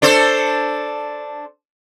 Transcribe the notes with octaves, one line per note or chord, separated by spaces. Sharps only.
D4 A4 C5